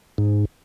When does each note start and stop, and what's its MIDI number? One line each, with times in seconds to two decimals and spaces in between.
0.18 0.45 44